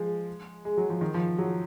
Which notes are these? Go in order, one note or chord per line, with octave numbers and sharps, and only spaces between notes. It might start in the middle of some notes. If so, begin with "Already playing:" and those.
Already playing: F3 G#3
G#3
F#3
F3
D#3
F3
F#3